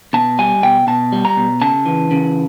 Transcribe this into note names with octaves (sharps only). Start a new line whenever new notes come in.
B2 A5
G3 G#5
B2 G5
B2 A5
G3
A#5
B2
C#3 A5
E3
C#3